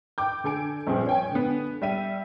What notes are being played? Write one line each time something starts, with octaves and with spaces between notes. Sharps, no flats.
G5 D6 G6
D3 A4 G#5 D7
A#1 G2 C4 G#4
C#5 G5 G#5
D3 B3
G3 E5 D#7